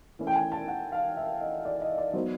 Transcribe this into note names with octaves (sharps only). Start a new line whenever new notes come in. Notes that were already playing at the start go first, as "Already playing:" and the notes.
E3 A3 C#4 E4
G5
G#5
A5
F#5
F5
E5
D#5
D5
D#5
D5
F#3 B3 D#4 C5